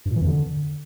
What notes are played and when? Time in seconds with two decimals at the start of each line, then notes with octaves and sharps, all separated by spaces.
0.06 G2
0.11 A#2
0.16 E3
0.21 F2
0.26 D3